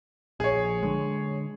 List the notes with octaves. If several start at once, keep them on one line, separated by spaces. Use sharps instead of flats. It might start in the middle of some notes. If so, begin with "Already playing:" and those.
A#1 G#4 C#5
D3 G#3